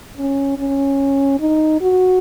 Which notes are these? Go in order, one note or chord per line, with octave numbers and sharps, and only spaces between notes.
C#4
C#4
D#4
F#4